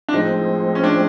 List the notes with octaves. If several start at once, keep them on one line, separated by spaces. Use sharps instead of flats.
D4
A2 F3 G#3 C4 D#4
C#4
D4